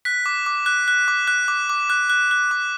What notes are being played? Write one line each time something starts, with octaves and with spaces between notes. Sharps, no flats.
F#6 B6
D6
D6
F#6
F#6
D6
F#6
D6
D6
F#6
F#6
F#6
D6